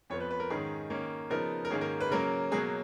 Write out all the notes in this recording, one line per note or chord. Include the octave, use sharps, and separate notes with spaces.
F2 F3 B3 C#5
B4
B4
A#4
G#2 D#3 G#3 C#4 G#4
D#3 A#3 C#4
C#3 F3 B3 D#4 A#4
A#4
G#2 D#3 A#3 C#4 G#4
A#4
B4
C#3 F#3 A#3 C#4 A#4
B2 F#3 A#3 G#4